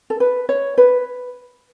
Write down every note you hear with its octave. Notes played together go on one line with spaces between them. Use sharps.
A4
B4
C#5
B4